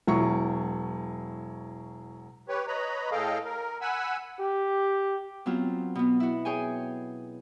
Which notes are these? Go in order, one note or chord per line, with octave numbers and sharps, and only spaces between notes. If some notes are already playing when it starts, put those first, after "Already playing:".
E1 F#3 E4 C#6
G4 B4 C#5
B4 C#5 D#5 A#5 B5
A2 G#4 A4 D#5 F5 G5
A#4
F#5 G#5 B5 E6
G4
F#3 B3 C4 F4
B2 B3
E4 F#4
G#4 C#5 G5 G#5